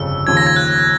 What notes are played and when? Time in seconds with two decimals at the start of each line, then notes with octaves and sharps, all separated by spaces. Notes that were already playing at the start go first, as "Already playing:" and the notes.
Already playing: G1 F2 C#3 E6
0.27 D#2 C#3 F3 G#6
0.37 A#6
0.47 G#6
0.56 F#6